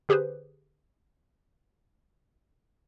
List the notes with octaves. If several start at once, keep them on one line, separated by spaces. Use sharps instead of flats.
D3 G4 G#4 B4 C5